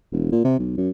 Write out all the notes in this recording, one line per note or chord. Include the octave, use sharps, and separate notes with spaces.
E1
A#2
C3
B1
F#2